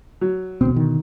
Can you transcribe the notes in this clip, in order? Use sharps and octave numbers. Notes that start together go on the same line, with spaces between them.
F#3
E1 D2 B2 C4
D3 D#3